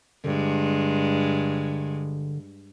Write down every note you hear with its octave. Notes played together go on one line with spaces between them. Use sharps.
G2 D3 G#3